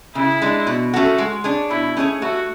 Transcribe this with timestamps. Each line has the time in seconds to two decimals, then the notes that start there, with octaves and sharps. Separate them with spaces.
0.15 C#3 E4
0.42 G#3 D4
0.67 B2
0.94 A3 C#4 F#4 A4
1.18 G#3
1.44 D4 G#4 C#5
1.70 B2 E4
1.97 A3 C#4 G#4 C#5
2.22 A3 F#4